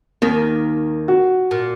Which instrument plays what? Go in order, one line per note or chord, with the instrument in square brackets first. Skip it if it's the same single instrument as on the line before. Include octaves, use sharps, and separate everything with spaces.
[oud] D#2 D#3 [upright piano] A#3
[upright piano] F#4
[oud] A#2